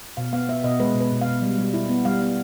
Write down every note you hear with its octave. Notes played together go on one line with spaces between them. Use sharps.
B2 F5
B3 F5
B3 E5
B2 D#5
G#3 B4
B2
B4
B2
F5
B2
G3
G3
E4
B3
G3 F5
B3